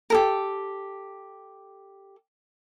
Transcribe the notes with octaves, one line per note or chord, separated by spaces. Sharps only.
G4 A4 A#4